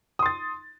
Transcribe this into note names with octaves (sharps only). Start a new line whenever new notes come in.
C6 D#6 A6